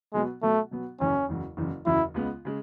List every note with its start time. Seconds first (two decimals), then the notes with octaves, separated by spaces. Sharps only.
0.13 B2 F#3 G#3 B3
0.42 B2 F#3 A3 B3
0.71 B2 F#3 B3
1.00 F#1 E2 C#3 F#3 C#4
1.29 F#1 E2 C#3 F#3
1.57 F#1 E2 C#3 F#3
1.86 F#1 E2 C#3 F#3 E4
2.14 C#2 C#3 G#3 B3
2.45 C#3 G#3